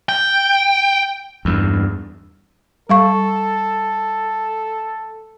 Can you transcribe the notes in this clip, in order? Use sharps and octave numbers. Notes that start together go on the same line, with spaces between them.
G5
E2 G2
G3 A4 F5 C#6